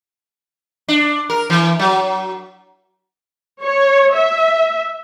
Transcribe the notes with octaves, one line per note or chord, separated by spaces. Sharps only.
D4
A#4
E3
F#3
C#5
E5